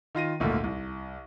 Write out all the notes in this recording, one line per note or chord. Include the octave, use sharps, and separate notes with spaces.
D#3 F4 A#6 D#7
G#1 D2 A#2 D3
C2